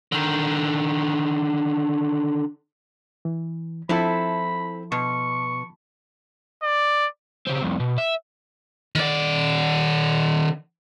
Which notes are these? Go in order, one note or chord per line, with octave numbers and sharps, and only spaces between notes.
D3 D#3
E3
F3 C4 E4 A4 E5 B5
B2 C#6
D5
C#3 C4
C2 F2
B2
E5
D#3 D5